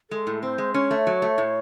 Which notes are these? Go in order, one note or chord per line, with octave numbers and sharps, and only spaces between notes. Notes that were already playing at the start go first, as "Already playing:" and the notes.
G#3 A4
A2
C4 C5
G#3
C#4 C#5
A3
F#3
A3
A2